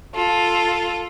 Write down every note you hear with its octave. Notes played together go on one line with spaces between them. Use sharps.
F4 A4